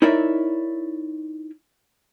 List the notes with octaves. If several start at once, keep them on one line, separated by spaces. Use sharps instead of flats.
D#4 E4 A#4 C#5 D5 E5